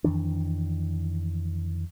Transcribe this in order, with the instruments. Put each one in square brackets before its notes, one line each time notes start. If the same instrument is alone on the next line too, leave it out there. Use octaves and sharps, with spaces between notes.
[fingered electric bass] F2 D#3 E3 D4